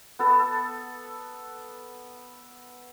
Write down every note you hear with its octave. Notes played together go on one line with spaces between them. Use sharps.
B3 A4